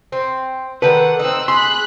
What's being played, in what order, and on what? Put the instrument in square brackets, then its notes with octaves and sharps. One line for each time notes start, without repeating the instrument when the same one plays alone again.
[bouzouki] C4
[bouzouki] D3 D#3 A4 [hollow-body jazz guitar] B4 [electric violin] F#5
[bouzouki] C4 D#4 [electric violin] E6 F#6
[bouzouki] G#4 [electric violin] B5 F#6 [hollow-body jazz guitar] C6